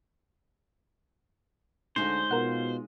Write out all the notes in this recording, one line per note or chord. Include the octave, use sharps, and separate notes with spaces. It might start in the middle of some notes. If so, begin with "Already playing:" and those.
D2 G#3 C#4 D#4 C5
B2 F4 A#4 F#5